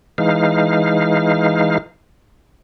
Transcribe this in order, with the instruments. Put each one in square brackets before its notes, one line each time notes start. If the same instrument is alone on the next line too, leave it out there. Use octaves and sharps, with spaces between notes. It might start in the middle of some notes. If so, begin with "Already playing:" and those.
[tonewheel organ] E3 G#3 D#4 F5